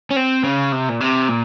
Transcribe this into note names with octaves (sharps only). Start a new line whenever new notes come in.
C#4
C4
C#3
C3
A#2
C3
A#2